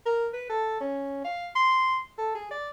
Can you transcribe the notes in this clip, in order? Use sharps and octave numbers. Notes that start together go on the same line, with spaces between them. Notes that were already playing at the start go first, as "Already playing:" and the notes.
A#4
B4
A4
C#4
F5
C6
A4
G#4
D5